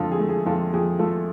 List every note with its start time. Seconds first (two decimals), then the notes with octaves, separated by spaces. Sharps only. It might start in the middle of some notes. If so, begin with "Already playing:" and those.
Already playing: F2 D3 F4 A4
0.12 G#4
0.19 A3
0.29 G#4
0.46 F2 F4 A4
0.73 F2 G#4
0.99 A3 F4 A4